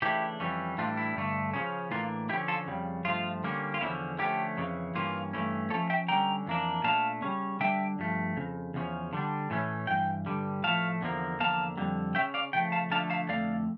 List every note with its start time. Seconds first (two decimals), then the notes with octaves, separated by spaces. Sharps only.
0.02 C#3 E3 A3 D4 E4 G4
0.40 F2 E3 G3 C#4
0.78 A2 E3 G3 D4 F4
0.97 E4
1.16 G2 D3 A3
1.54 C#3 F3 C#4
1.91 A2 E3 A#3 D4 F4
2.29 D3 F3 C#4 E4 G4
2.48 F4 A4
2.67 F2 C#3 G3
3.05 G2 F3 A3 F4
3.44 D3 G3 A#3 C#4
3.74 F4
3.81 E2 D3 F3 C#4 E4
4.19 D3 F3 A3 C#4 E4 G4
4.57 F2 C#3 E3
4.95 G2 E3 A#3 C#4 F4
5.33 G2 E3 A3 C#4
5.70 A2 F3 A3 C#4 A4 C#5
5.90 E5 G5
6.08 D3 G3 C#4 G5 A#5
6.47 F2 E3 A#3 D4
6.84 A#2 A3 D4 F5 A5
7.22 C#3 G3 C#4
7.60 D3 G3 D4 E5 G5
7.99 G2 F3 A3
8.37 F2 C#3
8.74 E2 C#3 F3 C#4
9.13 D3 G3 D4
9.50 A2 E3 A3 C#4
9.87 G2 E3 G5
10.26 G2 D3 G3
10.64 A2 F3 A3 F5 A5
11.01 E2 D3 F3 A#3
11.39 E2 D3 F3 A#3 F5 A5
11.77 F2 D3 G3
12.15 C#3 F3 C#4 E5 G5
12.34 D5 F5
12.53 C#3 F3 A3 G5
12.72 F5 A5
12.91 D3 F3 A3 D4 F5 A5
13.10 F5 A5
13.29 F2 D3 A3 D5 F5